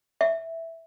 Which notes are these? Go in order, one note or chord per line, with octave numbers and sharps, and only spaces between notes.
E5